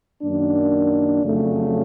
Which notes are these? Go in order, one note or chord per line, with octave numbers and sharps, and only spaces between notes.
F#2 D#3 F#3 A#3 D4
F2 C#3 F#3 A3 D4